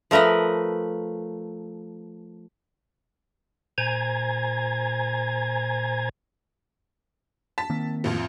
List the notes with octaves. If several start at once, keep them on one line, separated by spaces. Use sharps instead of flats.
F3 A3 A#4 B4 D#5
A#2 C5 G#5 A#5 G#6
A5 B6
D#3 A#3 C4
A1 F2 F4